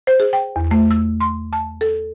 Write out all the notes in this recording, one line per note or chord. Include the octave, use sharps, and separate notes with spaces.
C5
G#4
G5
E2
A3
E6
C6
A5
A4